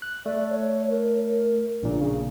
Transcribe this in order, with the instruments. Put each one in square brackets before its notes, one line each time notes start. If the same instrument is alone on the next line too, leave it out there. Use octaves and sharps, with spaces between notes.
[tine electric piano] F#6
[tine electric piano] A3 [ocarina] D5
[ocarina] C#5
A#4
[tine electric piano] A#1 A#2 C#3 [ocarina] D4
[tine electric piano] C#3